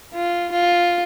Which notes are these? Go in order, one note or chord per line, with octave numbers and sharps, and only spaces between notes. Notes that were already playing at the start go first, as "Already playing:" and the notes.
F4
F4